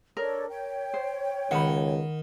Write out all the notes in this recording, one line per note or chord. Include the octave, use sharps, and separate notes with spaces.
D4 A4 A#4 C#5
C#5 G5
C5
C#2 D#3 F#5 B5